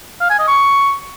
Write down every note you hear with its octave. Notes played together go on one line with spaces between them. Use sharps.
F5
G#5
D#5
C#6